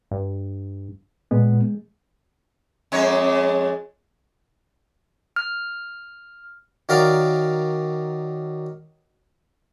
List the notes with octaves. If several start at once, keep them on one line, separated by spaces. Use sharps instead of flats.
G2
A#2 G#3 B3
F2 G#3 C#5
F6
D#3 F#3 A#4 D5 F5